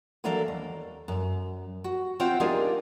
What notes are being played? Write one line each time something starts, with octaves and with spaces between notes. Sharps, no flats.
E3 F#3 A#3 D4 A4 A#5
D#2
F#2
F#4
C4 F4 C5 E5 F#5 G5
G3 A#3 D4 D#4 F4 G#4